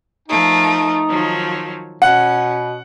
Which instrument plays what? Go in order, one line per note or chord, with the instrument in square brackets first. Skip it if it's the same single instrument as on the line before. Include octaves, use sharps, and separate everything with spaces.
[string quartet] F3 A3 A#4 [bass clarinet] D#4
[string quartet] D#3 F3 F#3
[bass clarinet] B2 [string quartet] C#4 [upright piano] F#5